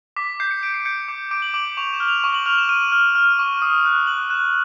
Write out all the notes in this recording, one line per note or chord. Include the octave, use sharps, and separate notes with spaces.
D6 B6
G6 C7
C#7
G6 D7
C7
G6 C#7
D6 C#7
D6 D7
F#7
D6 F#7
F#7
C#6 F7
E7
F6
F7
C#6
F#7
F6 F7
E7
F6 D#7
F6
F6
C#6
D#6
F#6
F#6 F#7
F#6 E7